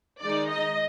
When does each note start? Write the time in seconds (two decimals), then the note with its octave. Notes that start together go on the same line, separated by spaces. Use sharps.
0.21 D#3 G#3 D#4 D5
0.49 D#5